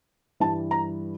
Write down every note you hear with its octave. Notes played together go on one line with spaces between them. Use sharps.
G2 E3 G3 A5
A#5